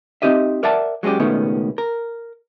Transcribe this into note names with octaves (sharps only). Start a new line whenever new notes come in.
C4 D4 D#4 G4 D#5 E5
A#4 D5 E5 F#5 A5
F#3 G#3 B3 C#4 G4
C#2 B2 D#3 A3 B3 C#4
A#4